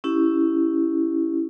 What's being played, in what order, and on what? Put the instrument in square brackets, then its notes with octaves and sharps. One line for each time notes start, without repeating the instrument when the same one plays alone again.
[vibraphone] C#4 E4 G4